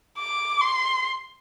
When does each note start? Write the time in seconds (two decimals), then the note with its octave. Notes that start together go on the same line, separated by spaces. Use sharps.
0.18 D6
0.61 C6